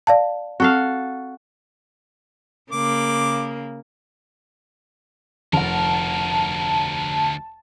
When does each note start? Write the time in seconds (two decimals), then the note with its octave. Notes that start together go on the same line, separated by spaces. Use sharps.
0.07 D5 F5 A5
0.60 C4 F#4 A4 F5
2.72 C#3 A#3 D6
5.53 F1 D2 A#4 F#5 A5